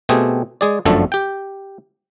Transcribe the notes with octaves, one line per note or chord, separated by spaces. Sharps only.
B2 A3 C4 G4 G#4
G#3 G#4 D5
G1 F#2 D3 F3 A3 A4
G4 G5